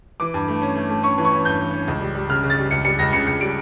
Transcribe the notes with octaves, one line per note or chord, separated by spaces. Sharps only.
E3 D6
G2
A3
C#4
A3
A3
C#4 C#6
E3
C#6
C#4
G2 G6
E3
C#4
C#2
G3
G3
C#3 F6
C#3
A6
G3
C#2 C#7
G3 C#7
C#2 A#6
C#3 C#7
C#2 C#7
G3 D7